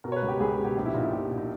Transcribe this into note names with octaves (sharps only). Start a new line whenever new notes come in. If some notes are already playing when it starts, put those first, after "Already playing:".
B2 A#4
C#5
B4
C#2
G4
C#2 G#4
G#4
B2
G4
A#1 G4
E4
A#2 D#4
E4
A#1 G4
A#2
D#4